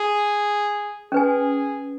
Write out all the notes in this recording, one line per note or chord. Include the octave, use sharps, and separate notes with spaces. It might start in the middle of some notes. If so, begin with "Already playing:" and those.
Already playing: G#4
C#4 G#4 B4 G#5